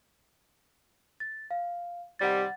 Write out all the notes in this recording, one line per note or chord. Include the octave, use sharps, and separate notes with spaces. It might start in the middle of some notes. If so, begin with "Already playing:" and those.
A6
F5
C3 D#3 G3 F#5 A6